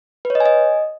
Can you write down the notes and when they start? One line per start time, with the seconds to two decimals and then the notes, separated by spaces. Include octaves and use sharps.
0.25 B4
0.30 C#5
0.35 D#5
0.40 G#5
0.46 D#5